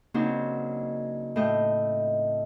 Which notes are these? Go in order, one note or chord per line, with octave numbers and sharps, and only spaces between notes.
C#3 F#3 A#3 C4 D4 D#4
A2 A3 D#5 G5